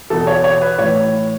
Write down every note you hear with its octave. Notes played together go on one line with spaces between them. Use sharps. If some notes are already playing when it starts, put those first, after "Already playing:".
E2 B2 A4
C#5
C#5
B4
A2 E3 C#5